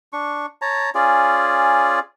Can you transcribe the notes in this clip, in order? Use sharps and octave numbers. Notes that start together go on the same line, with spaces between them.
D4 C#6
C#5 A5 A#5
C#4 F4 G#4 D5